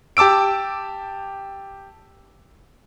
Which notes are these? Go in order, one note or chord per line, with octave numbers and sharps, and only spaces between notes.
G4 A5 D6 E6 D7